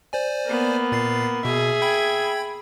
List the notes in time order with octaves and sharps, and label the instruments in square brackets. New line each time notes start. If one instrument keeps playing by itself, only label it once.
[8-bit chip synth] C5 D5 G#5
[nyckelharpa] A#3 B3
[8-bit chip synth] A#2 A6 C7
[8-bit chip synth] B2 [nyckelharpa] G#4 E5
[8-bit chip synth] G5 B5 G#6